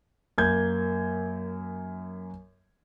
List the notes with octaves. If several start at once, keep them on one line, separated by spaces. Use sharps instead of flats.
F#2 A#3 G6 G#6